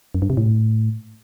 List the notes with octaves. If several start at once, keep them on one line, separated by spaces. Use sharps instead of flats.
F#2
G2
C3
A2